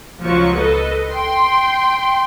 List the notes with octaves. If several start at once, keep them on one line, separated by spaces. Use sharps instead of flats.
C#2 F3 F#3 C#6
A4 B4 D#5
G5 C6